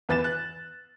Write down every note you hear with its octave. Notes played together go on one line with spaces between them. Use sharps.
E2 B4 A6 E7
F#6